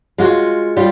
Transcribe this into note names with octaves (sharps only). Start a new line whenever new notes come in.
G#3 F4 F#4
G3 F4